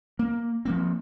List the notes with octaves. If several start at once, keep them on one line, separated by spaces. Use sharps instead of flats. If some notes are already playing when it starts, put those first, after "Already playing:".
A#3
F3 A#3 C4